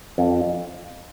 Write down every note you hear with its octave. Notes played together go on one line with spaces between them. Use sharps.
F2